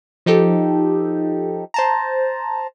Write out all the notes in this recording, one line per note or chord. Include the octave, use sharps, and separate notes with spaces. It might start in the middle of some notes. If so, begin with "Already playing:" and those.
F3 D#4 G4 A4
C5 A5 A#5